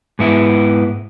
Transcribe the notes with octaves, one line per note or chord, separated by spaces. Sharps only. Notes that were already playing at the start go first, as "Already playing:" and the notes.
G#2 B3 E4